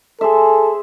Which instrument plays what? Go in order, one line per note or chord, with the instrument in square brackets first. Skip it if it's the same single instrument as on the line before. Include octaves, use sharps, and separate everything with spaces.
[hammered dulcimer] G#4 C5 E5 [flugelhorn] A4